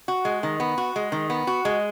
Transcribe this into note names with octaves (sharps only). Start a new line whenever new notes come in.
F#4
G#3
D#3
B3
F#4
G#3
D#3
B3
F#4
G#3